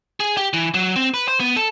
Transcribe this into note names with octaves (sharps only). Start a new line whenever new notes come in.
G#4
G4
E3
F#3
C4
B4
C5
B3
A4